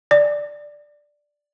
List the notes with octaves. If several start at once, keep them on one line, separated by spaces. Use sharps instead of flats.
D5